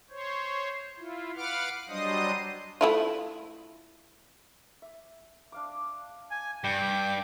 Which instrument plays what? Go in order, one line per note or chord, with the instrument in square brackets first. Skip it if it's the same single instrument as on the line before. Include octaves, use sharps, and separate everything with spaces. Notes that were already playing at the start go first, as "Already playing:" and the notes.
[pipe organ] C5 C#5
E4 F4
B4 F5 F#5 D6 F6
F#3 G3 D4 C5 D#5 D#6
[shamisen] A3 E4 F4
[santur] E5
D4 F5 D6
[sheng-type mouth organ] G#5
[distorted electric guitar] G2 [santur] G3 [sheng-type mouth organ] G5 D6